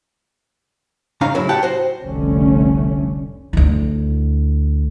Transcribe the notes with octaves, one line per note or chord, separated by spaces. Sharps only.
G#2 C#3 D4 D#4 F5 A#5
A2 C#3 F#3 E4
G4 F#5 G5 A5
F#4 C5
F1 C2 D3 A3 C#4
D2 E4